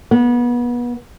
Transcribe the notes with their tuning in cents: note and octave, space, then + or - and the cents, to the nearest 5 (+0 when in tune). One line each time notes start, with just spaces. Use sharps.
B3 -30